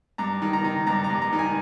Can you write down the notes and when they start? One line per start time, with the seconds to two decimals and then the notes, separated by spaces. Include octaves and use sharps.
0.18 G2 A#5
0.42 D#3
0.53 A#5
0.64 D#3
0.87 G2 A#5
1.04 A#5
1.10 G2
1.22 A#5
1.33 D#3
1.39 G#5